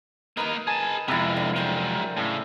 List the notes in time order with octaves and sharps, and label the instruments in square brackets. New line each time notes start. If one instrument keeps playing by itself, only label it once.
[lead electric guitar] A#3 D#5 [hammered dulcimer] D#4 A#4 B4
[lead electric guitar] G#4 A5 [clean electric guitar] G#5
[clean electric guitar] F2 G#2 C3 [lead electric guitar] G#3 B3 [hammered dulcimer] E4 A#4
[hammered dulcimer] D3
[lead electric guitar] F#3 G#3 [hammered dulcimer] A#4 C5 G5
[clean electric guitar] A2 [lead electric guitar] C#3